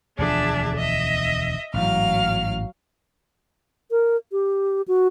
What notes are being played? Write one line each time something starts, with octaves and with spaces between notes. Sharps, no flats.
E1 D2 F3 D4 G#4 E5
D#5 E5
A1 G#2 E3 F#3 F5 F6
A#4
G4
F#4